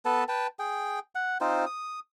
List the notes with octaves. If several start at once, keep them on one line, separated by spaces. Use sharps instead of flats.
B3 A4 B4 A5
B4 G5 A5
G#4 G5
F#5
C4 D#4 F4 C5
D#6